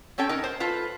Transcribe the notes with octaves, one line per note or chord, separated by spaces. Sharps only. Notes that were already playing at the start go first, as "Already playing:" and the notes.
C4 C#4 A4 G5
D#4 A#4
C5
F4 A4 B4